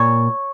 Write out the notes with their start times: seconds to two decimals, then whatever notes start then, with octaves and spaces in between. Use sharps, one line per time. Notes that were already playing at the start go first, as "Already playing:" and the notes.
Already playing: A#2 C#5